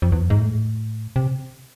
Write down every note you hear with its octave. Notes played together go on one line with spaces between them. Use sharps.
F2
E2
F2
G#2
A2
C3